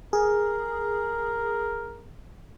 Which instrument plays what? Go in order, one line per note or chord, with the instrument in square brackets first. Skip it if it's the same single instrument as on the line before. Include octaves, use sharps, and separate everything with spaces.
[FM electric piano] G#4 [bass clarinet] A#4